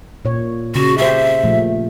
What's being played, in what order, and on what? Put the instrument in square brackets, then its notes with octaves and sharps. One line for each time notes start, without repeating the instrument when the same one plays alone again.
[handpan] A#2 C#5
[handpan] C#3 [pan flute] F#4
[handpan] G4 C5 [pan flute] E5
[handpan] A#2 F3 A3